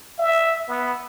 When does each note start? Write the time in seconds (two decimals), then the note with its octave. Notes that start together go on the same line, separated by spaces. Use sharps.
0.19 E5
0.68 B3